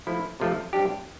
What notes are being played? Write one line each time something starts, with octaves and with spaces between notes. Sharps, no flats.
F3 A3 E4
C3 F3 A3
C3 G3 D4 G4